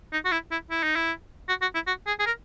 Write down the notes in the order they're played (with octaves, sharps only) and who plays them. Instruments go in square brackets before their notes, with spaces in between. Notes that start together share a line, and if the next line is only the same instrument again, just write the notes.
[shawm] D#4
F#4
E4
E4
E4
D#4
E4
F#4
F#4
E4
F#4
G#4
G#4
A#4